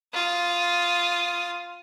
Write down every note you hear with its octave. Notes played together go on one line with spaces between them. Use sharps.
F4 D#6